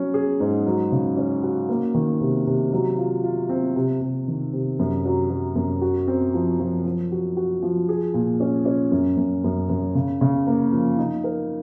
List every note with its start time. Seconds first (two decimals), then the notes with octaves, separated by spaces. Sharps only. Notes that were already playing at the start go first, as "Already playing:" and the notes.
Already playing: F#3 C#4
0.14 G#4
0.40 G#2
0.66 F#3
0.92 C#3
1.17 C#4
1.43 F#4
1.69 A#3
1.94 D#3
2.21 C3
2.47 C3
2.73 F#3
2.98 F4
3.23 F4
3.49 C4
3.76 C3
4.01 C3
4.28 D#3
4.53 C3
4.79 F#2
5.05 F#3
5.30 F#3
5.56 F#2
5.81 F#4
6.07 C4
6.34 F3
6.60 F3
6.85 F3
7.12 F#4
7.37 F#4
7.63 F3
7.89 G#4
8.14 A#2
8.40 C#4
8.65 C#4
8.92 F#2
9.17 F#2
9.44 F#2
9.69 F#2
9.95 C#3
10.21 C#3
10.47 A#3
10.72 F3
10.98 D#4
11.24 A#4